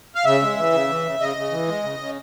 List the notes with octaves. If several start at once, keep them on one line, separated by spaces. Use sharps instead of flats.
F5
C#3 E5
G#3
E3
C#3
E3
C#3
C#3 D#5
C#3
E3
G#3
C#3
C#3